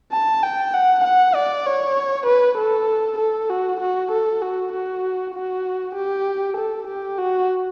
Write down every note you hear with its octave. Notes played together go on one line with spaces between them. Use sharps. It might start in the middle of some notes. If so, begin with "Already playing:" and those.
A5
G5
F#5
F#5
D5
C#5
B4
A4
A4
F#4
F#4
A4
F#4
F#4
F#4
G4
A4
G4
F#4